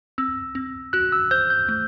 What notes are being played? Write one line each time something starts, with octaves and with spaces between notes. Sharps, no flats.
C4 E6
C4
F#4 F#6
E6
C5 G6
G6
A3